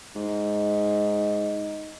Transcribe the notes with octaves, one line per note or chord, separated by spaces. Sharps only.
G#2 D#4